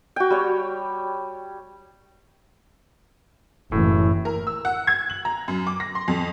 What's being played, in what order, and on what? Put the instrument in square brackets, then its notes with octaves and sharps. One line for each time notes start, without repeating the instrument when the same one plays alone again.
[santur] F#4 G5
G3 C#5
[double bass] F#1 E3 [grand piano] A2
[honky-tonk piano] A#4
E6
F#5
G#6
F#7
A#5
F#2
D6
A#6
C6
F2